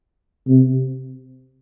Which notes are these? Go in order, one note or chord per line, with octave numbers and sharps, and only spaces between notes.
C3